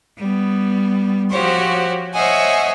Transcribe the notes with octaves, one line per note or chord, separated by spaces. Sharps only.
G3 B3
F3 F#4 G4 C5 C#5
C5 C#5 D#5 E5 F#5 G#5